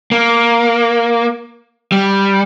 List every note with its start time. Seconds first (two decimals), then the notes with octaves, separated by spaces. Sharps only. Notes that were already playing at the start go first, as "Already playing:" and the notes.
0.12 A#3
1.92 G3